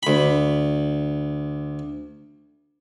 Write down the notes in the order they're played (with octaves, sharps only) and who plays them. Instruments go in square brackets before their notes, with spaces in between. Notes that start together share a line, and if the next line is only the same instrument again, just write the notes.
[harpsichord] D2 B5